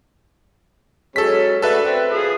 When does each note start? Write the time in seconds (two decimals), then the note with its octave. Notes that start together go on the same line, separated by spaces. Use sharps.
1.16 F#3 G#3 C#4 A4 B6
1.62 A3 D4 F#4 A4 B4 E5
1.84 C4
2.12 F4 G#4 D#6